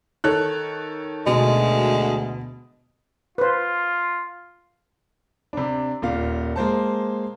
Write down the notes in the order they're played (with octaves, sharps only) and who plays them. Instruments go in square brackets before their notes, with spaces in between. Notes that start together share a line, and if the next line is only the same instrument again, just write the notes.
[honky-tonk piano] D#3 A4 C#5 [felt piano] F#6
[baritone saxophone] D2 [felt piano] B2 [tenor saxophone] G#3
[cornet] F4 [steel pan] B4 C5
[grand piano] C3 D4
D#1 A#2 F5
G#3 A#3 C5 A5